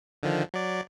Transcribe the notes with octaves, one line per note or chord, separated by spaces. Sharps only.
D3 D#3 F3
F#3 D5